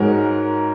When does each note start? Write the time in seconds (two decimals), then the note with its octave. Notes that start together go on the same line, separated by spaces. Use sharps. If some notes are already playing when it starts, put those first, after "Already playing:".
Already playing: G#2 G#3 F#4 A#4 C#5